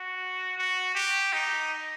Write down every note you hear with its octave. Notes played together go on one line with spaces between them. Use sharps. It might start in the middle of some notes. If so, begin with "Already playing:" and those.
Already playing: F#4
F#4
G4
D#4